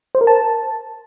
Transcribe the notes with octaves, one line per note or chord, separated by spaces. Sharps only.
C5
A#4
A5